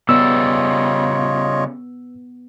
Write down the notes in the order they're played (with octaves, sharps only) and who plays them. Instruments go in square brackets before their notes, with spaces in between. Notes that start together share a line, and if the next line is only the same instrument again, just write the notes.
[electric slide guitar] C#3 G3 [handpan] B3 [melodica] F4 C#5 D#5 [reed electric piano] E6